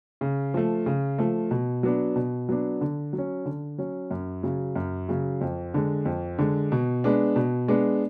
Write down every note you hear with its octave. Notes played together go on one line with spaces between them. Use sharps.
C#3
F3 A3
C#3
F3 A3
B2
F#3 B3 D4
B2
F#3 B3 D4
D3
F#3
C#4
D3
F#3 C#4
F#2
C#3 F#3
F#2
C#3 F#3
F2
D3 G#3
F2
D3 G#3
B2
G#3 B3 D4
B2
G#3 B3 D4